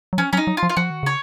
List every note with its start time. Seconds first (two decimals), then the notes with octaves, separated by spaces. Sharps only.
0.13 F#3
0.18 F3 C#4
0.33 F#3 C#4
0.37 D#4
0.47 F#3
0.57 F4
0.63 F3
0.69 F4
0.77 F3 F#4
0.90 D#3
1.03 C#3 C#5